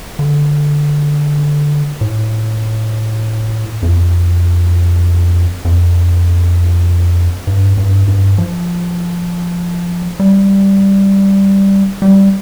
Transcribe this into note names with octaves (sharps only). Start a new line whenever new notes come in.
D3
A2
F2
F2
G2
G2
G2
F3
G3
G3